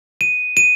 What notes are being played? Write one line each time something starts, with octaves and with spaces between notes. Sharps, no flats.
D#7
D#7